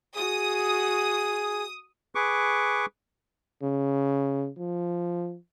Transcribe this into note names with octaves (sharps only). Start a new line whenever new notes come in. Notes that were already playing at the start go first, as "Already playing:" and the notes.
F#4 G#4 D#6
G#4 B4 C#6 D6
C#3
F3